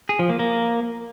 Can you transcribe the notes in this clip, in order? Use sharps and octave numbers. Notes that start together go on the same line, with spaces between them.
G#4
F3
A#3
A#3